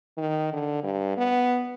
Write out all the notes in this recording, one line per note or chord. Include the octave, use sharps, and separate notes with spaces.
D#3
D3
G2
B3